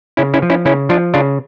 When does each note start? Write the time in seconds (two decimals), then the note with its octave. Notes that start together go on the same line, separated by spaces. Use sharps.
0.17 C#3 C#4 E4
0.34 C#4 E4
0.42 F3
0.50 C#4 E4
0.65 C#3 C#4 E4
0.89 F3 D4 F4
1.14 C#3 D4 F4